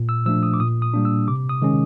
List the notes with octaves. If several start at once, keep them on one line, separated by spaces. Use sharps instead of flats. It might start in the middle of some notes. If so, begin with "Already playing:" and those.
Already playing: A#2
E6
F3 A3 D4 E6
D#6
D6
A#2 D#6
D#6
G3 A#3 D4
E6
C3 D6
D#6
D#3 G#3 C#4